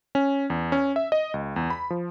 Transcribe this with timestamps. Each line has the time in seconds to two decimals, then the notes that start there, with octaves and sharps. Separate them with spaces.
0.15 C#4
0.50 E2
0.72 C#4
0.96 E5
1.12 D#5
1.34 C#2
1.56 E2
1.70 B5
1.90 F3